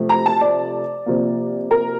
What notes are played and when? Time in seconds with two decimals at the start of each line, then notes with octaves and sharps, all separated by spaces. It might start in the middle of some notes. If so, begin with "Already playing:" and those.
Already playing: C3 F3 A3
0.09 A#5
0.26 A5
0.41 D5
1.06 C3 F3 A#3
1.71 A#4